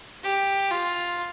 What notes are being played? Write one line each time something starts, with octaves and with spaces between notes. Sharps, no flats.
G4
F4